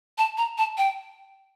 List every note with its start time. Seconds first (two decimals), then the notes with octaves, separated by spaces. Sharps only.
0.18 A5
0.38 A#5
0.58 A5
0.78 G5